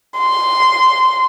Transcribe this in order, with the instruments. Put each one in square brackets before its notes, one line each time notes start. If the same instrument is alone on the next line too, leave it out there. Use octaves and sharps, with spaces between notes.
[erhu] C6